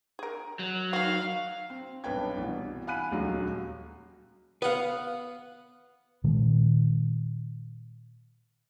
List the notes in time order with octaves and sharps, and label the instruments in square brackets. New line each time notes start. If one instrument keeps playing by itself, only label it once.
[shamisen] G#4 A#4
[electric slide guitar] F#3
[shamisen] D#3 F#4 [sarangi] F5
[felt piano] C4
B1 G2 B4 C#5 G5 G#6
C2 B2 E3
F5 F#5 G#5 B5 F#6 D#7
D#1 C#2 F#3
[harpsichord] B3 F#5 [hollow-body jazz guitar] B4 F5
[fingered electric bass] A#2 D#3 G#3